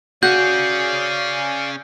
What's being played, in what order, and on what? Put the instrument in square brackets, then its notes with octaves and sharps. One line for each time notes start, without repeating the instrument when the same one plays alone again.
[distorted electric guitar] C#4 G#4 [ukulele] F#4 [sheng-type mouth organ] D5 F5 [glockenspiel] G6